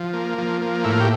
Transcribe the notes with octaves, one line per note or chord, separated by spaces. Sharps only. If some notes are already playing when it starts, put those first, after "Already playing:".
Already playing: F3
A#3
F3
A#3
A2 E4
F4
G4